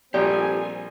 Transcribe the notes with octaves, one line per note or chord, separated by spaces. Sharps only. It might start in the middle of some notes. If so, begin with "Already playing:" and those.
A#1 G3 C4 G4 A4 D5 G#5